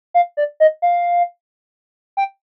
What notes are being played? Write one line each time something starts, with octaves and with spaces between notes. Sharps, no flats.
F5
D5
D#5
F5
G5